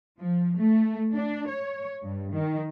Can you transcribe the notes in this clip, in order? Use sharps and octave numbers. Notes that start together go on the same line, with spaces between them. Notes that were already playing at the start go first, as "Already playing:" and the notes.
F3
A3
D4
C#5
G2
D#3